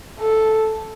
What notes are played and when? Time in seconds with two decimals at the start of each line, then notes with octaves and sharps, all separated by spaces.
0.20 A4